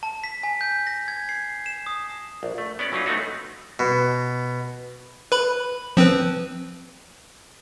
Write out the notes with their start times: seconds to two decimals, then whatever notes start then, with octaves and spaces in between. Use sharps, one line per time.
0.03 A5
0.24 B6
0.43 G#5
0.61 G6
0.87 A#6
1.08 G#6
1.29 C7
1.66 E7
1.86 D#6
2.43 A#1
2.58 A3
2.79 B3 C#4 D5
2.92 E3 F#3 C#4 D#4 F4
3.06 A3 B3 C4 D#4 F#4
3.79 B2
5.32 B4 B5
5.97 F3 C4 B4